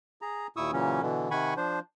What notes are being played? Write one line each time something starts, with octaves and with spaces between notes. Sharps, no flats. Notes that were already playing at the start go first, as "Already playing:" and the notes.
G#4 A#5
D#2 A#2 E4 C#6 D#6 E6
A#2 C#3 E3 F#3 C#4
B2 D3 E3
C3 D#3 F#5 G#5 B5 C#6
F3 D4 C5